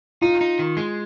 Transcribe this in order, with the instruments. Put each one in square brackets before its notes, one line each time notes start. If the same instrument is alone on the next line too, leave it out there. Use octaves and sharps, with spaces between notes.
[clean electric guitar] D#4 [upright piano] F4
[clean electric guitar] D#4
D#3
G#3